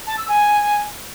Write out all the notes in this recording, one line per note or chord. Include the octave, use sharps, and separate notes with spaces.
A5
E6
G#5